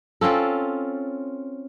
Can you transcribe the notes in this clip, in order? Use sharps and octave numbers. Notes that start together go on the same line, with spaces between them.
C4 C#4 F4 A4